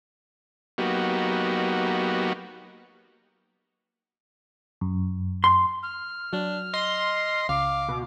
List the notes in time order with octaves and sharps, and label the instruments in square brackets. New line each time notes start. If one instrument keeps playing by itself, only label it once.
[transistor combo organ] F#3 A#3 B3 D#4 F#4 G4
[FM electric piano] F#2
[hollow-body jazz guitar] C6
[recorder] F6
[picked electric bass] F#3 [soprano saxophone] D4
[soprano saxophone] D#5 [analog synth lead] C6
[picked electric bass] C#2 [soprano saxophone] F5 [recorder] D6
[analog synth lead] B2